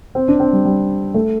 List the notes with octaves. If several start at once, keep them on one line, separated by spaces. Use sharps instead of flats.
C4
D4
C4
G3
G3
A3